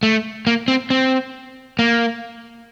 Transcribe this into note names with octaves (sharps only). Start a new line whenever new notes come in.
A3
A#3
C4
C4
A#3